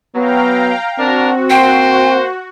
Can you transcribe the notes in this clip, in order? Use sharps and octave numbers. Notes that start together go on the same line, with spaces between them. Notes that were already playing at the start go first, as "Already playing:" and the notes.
F#3 B3 F5 G5 A#5
C4 D4 F#4 A#4
A#3 C5 G5